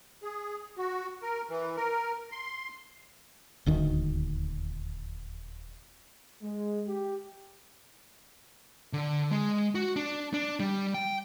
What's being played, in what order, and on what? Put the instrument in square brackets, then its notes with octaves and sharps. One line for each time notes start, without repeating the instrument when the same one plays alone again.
[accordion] G#4
F#4
A#4
E3
A#4
C6
[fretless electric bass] D#1 D2 D#3
[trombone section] G#3
G4
[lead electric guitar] D3
G#3
F#4
D4
D4
G3
G5